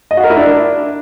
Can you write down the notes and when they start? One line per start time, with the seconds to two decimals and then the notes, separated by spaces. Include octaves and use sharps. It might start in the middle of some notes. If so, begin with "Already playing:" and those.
0.11 D#5
0.17 F#4
0.24 A#4
0.30 E4
0.37 D4